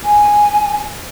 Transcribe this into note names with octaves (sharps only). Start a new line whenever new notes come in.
G#5